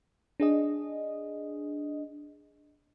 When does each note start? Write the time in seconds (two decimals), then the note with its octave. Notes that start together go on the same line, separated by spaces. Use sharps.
0.40 D4 G#4 D#5